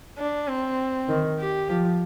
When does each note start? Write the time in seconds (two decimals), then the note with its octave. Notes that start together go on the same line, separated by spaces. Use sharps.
0.19 D4
0.48 C4
1.09 D#3
1.39 G4
1.69 F3